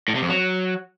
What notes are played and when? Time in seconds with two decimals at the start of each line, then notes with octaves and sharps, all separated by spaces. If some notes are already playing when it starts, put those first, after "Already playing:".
0.08 A2
0.15 C3
0.22 F2
0.29 F#3